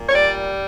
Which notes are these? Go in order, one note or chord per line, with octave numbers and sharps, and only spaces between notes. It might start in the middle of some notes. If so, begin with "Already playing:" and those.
Already playing: A#2
C#5
G3 D5